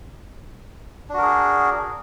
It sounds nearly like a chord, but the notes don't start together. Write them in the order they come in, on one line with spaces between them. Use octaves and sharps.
D4 F#4 A#4 G#4